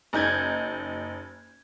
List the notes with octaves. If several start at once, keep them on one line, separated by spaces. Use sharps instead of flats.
F#1 D#4 G6 G#6